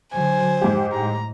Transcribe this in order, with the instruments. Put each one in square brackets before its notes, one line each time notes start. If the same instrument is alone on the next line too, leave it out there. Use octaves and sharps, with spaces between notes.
[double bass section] D3 F#3 [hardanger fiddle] C5 [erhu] G#5
[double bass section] F2 [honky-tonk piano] G#2 G4
[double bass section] A2 [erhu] A#5